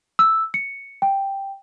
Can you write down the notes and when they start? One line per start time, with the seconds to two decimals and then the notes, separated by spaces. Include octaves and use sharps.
0.19 E6
0.54 C#7
1.02 G5